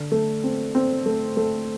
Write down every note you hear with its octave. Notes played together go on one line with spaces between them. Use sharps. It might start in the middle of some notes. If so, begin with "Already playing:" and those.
Already playing: D3
A3
C4
C4
A3
A3